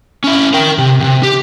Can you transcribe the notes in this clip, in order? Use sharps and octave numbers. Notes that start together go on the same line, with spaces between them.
C#4 E4
A#4 G5
C3
D2 C3
G4